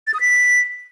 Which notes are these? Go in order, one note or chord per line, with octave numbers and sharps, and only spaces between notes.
A6
D#6
B6